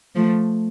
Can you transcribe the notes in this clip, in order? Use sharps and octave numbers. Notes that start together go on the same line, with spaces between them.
F3 A3